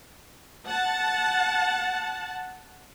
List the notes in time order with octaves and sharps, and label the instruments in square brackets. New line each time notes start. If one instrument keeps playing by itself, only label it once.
[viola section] F#5 A5